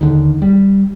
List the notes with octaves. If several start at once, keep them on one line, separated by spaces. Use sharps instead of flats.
D#2 D3 D#3
G3